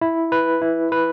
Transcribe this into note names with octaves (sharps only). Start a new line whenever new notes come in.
E4
B4
E4
B4